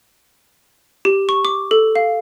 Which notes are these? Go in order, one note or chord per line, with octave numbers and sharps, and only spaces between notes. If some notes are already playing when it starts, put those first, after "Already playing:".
G4
C#6
D6
A4
F5